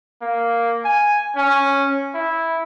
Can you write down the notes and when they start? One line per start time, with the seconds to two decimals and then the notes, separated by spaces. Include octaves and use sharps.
0.22 A#3
0.85 G#5
1.36 C#4
2.14 E4